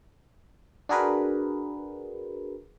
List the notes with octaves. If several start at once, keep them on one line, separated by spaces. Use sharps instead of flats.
D4 F#4 G#4 A#4 B4